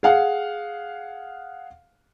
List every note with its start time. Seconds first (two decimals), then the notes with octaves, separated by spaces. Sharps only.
0.03 G#4 F5 F#5